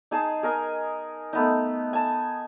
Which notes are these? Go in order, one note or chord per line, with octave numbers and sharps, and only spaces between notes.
D#4 G#4 A5
G#4 A#4 D#5 G#5
A3 B3 D#4
G#5 A5